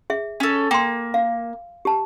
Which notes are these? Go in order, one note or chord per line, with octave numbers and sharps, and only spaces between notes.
G#4 E5
C#4 A4
A#3 G5 C6
F5
G4 A5